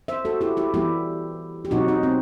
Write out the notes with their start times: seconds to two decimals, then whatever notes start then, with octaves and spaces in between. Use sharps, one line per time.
0.08 C5 E5
0.25 F#4 A4
0.41 E4 G4
0.57 E4 G4
0.74 E3 G3 B3 E4 G4
1.65 G4
1.71 B2 F#3 C4 D#4 F#4
1.88 D#4
2.03 C4